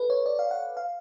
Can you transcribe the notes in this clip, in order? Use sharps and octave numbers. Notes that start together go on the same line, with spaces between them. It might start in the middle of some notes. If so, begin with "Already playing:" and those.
Already playing: A4 B4
C#5
D5
F5
F#5
F5